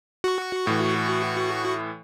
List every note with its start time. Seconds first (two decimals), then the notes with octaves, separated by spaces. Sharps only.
0.24 F#4 C#6
0.67 A2 E3